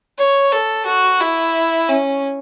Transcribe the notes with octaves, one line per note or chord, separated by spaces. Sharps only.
C#5
A4
F#4
E4
C#4